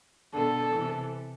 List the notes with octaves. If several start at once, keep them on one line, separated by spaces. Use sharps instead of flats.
B2 D3 A4
C3 E3